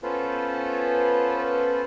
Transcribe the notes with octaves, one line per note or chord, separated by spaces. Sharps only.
B3 C#4 F4 A4 B4 C5